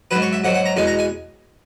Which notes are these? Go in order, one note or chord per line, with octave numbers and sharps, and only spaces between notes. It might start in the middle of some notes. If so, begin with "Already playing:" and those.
G#2 F#3 B4
C#5
E5
G#2 F#3 F#5
F#5
A#5
E2 B2 G#3 G#5
A#5
G#5